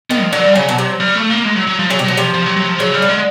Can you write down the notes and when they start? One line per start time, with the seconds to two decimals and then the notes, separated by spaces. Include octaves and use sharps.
0.10 D#3 B3
0.22 F3
0.32 D3 F#3
0.45 G3
0.56 C#3 F#3
0.69 B2
0.78 C3
1.00 G3
1.15 A3
1.30 A#3
1.45 G#3
1.56 F#3
1.67 F#3
1.79 F3
1.90 C#3 F#3
1.99 C3
2.04 B2 F#3
2.17 C3 F3
2.34 F3
2.46 F#3
2.57 F#3
2.68 F3
2.79 C#3 F#3
2.94 G3
3.02 D3
3.09 G#3